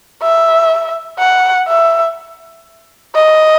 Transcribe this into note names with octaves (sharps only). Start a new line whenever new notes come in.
E5
F#5
E5
D#5